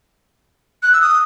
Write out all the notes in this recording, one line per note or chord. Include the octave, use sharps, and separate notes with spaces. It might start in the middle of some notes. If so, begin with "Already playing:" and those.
F#6
E6
D#6